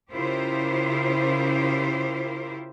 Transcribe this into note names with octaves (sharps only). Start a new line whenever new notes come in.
C#3 E4 F4 G4 A#4 C5